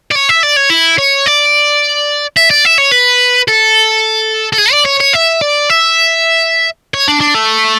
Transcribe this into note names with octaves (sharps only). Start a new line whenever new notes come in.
D5
C#5
E5
D5
C#5
E4
C#5
D5
E5
D5
E5
C#5
B4
A4
A4
G#4
D5
C#5
C#5
E5
D5
E5
C#5
D4
D4
A3